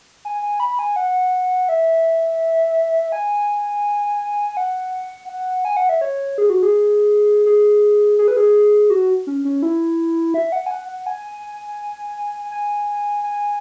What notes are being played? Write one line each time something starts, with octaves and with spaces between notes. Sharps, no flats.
G#5
G#5
B5
G#5
F#5
E5
G#5
F#5
F#5
G#5
F#5
E5
C#5
G#4
F#4
G#4
G#4
G#4
B4
G#4
F#4
C#4
C#4
E4
E5
F#5
G#5
F#5
F#5
G#5
G#5
G#5